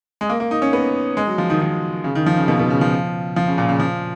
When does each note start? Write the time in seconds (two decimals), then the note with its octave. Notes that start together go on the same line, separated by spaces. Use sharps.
0.21 G#3
0.29 A#3
0.40 A#3
0.51 D#4
0.62 C#4
0.73 B3
1.17 G#3
1.27 F#3
1.38 F3
1.50 D#3
1.61 D#3
2.04 C#3
2.15 D#3
2.26 F3
2.37 C#3
2.48 B2
2.59 B2
2.70 C#3
2.81 F3
3.36 F3
3.47 C#3
3.58 A#2
3.69 C#3
3.80 F3